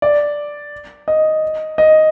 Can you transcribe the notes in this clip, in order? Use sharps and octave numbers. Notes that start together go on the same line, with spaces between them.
D5
D#5
D#5